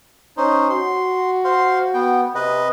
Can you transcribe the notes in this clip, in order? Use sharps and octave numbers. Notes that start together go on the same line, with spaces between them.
C#4 D#4 C5
F#4 C6
C5 F5 C6
B3 G5
C3 B4 D#5